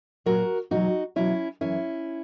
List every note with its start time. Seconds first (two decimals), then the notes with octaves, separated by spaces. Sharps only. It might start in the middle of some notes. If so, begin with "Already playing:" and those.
0.26 A#2 F#3 F#4 A#4
0.71 E2 B2 F#3 D#4 F#4
1.16 E2 B2 F#3 C#4 E4
1.61 F#2 E3 C#4 E4